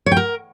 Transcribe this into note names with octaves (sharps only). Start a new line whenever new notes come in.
C#5
G5
A#4